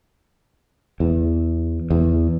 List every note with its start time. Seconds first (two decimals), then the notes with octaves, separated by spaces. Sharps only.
1.00 E2
1.90 E2